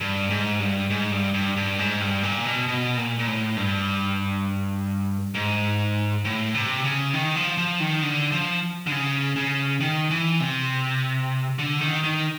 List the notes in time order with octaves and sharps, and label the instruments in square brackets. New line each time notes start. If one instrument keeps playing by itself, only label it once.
[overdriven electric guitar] G2
G#2
G2
G#2
G2
G2
G2
G#2
G2
A#2
B2
B2
A#2
A#2
A2
G2
G#2
A2
C3
C#3
D#3
F3
F3
D#3
D3
F3
D3
C#3
C#3
D#3
E3
C3
D3
D#3
D#3